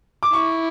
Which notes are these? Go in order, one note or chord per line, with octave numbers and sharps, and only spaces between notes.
D6
E4 C#6